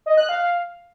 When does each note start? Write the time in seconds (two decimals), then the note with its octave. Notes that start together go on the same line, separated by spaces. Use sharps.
0.06 D#5
0.17 F#6
0.29 F5